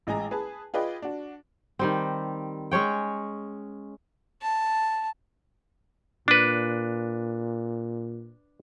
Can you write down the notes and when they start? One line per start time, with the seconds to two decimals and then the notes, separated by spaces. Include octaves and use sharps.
0.07 A1 G#3 D#5 G#5 A#5
0.31 G#4 B4 G#5 A5
0.74 F4 G#4 B4 D5 D#5 G5
1.02 D4 F#4
1.79 D#3 G3 C4
2.71 G#3 C#4 C#5 G5
4.42 A5
6.28 A#2 D4 B4